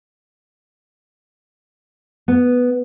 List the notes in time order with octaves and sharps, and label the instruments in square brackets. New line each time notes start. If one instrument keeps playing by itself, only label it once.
[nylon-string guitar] B3